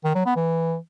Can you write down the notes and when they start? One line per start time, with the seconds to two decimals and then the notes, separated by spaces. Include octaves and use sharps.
0.05 D#3
0.15 F#3
0.26 B3
0.36 E3